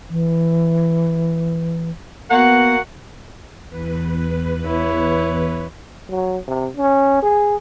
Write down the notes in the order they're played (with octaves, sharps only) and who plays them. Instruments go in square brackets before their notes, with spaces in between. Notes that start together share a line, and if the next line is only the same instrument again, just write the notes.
[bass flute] E3
[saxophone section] A#3 F#4 F#5 [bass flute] B3
[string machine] E2 B4
[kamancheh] E4 C#5
[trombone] F#3
C3
C#4
G#4